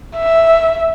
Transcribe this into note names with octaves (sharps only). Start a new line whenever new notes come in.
E5